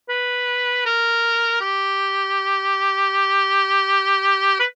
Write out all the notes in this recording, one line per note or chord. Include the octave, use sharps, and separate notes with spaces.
B4
A#4
G4
B4